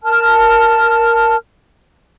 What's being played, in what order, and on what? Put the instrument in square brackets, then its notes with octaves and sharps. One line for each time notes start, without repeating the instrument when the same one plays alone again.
[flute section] A#4 A5 F6